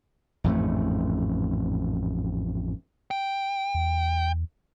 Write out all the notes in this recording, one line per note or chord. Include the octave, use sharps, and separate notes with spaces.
A1 F2 G#2 A3
G5
E2